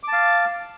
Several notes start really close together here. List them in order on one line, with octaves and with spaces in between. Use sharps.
D6 A5 F5